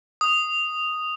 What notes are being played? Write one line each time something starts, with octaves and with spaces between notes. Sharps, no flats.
D#6